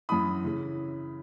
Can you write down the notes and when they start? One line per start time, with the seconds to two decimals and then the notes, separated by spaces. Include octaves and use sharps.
0.09 F#2 E3 B5 D#6
0.45 C#3 E3